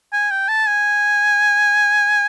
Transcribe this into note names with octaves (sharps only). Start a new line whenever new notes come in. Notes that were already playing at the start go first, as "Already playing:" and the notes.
G#5
G5
A5
G#5